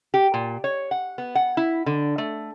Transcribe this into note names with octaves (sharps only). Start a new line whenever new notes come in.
G4
A#2
C#5
F#5
B3
F#5
E4
D3
A3